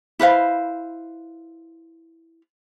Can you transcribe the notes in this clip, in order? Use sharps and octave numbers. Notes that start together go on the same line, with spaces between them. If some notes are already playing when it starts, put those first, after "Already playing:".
E4 B4 C5 F5